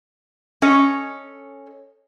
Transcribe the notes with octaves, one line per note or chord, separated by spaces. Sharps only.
C#4 A4 C#5 D#5